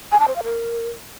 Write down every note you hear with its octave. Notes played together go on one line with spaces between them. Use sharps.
G#5
A5
C5
F5
A#4